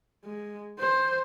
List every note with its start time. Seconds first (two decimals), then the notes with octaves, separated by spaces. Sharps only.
0.25 G#3
0.79 C5